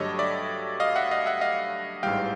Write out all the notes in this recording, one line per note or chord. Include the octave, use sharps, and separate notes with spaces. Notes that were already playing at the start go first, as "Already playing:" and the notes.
Already playing: G2 D3 F#3 A3 G4 A4 C#5 D#5
D5 E5
D#5 F5
E5 F#5
D#5 F5
E5 F#5
D#5 F5
A1 G#2 E3 G3 F5 G5